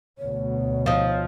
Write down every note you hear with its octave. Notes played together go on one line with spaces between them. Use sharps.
D2 B2 C#5
F3 D#4